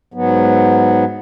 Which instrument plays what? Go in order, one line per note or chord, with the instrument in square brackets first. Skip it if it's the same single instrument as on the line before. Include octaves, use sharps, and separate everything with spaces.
[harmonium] G#2 F#3 B3